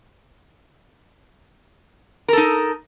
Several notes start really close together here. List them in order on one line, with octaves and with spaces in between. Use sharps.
A#4 A4 D#4